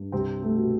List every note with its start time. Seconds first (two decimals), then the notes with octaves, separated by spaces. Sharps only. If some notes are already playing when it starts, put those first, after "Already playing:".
Already playing: G2
0.12 C2 C3 C4
0.42 A3
0.55 B2